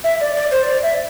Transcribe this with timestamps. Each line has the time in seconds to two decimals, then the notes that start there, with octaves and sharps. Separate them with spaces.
0.04 E5
0.21 D5
0.36 D5
0.52 C5
0.67 D5
0.83 E5